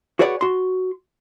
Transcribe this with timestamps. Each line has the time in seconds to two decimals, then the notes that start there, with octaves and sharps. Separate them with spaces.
0.19 F#4 G#4 B4 C#5 D5 F#5
0.41 F#4 C6